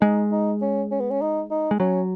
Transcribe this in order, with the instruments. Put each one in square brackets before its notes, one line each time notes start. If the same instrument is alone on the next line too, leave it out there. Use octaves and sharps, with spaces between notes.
[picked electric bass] G#3 [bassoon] D#4
[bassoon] D#4
C#4
C#4
B3
C#4
D#4
D#4
[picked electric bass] G#3
[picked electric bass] F#3 [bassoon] C#4